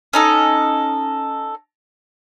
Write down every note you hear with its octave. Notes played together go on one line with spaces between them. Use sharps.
C#4 D#4 A4